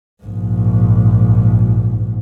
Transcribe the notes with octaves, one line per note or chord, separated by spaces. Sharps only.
A#1 G#2